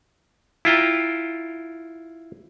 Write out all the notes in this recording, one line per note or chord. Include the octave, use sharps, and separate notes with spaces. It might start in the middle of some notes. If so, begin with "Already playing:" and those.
E4 F4 G5 A#5